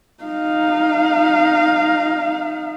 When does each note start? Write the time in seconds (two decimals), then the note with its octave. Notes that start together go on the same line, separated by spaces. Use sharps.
0.23 D#4 F5